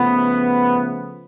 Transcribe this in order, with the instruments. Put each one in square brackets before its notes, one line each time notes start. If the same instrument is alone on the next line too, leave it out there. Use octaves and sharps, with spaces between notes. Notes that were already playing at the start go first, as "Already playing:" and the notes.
Already playing: [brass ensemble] C#3 F3 A3 B3